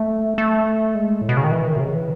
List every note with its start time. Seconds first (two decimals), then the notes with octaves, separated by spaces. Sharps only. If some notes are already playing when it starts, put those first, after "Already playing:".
Already playing: A3
0.38 A3
0.95 G#3
1.22 A2
1.29 B2
1.37 C#3
1.44 D#3
1.51 E3
1.66 D#3
1.76 B2
1.80 C#3
1.95 E3